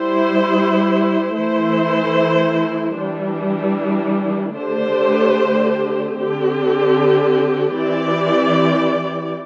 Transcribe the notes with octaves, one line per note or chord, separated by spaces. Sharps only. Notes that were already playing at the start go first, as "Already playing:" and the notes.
Already playing: G3 E4 C5
E3 A3 E4 C5
E3 G3 D4
D3 A3 D4 G4 C5
D3 C4 G4
E3 C4 G4 D5